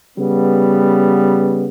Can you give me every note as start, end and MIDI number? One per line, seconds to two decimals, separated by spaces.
0.18 1.68 49
0.18 1.68 55
0.18 1.68 59